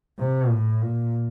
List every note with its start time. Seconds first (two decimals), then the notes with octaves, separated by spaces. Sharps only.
0.19 C3
0.51 A2
0.82 A#2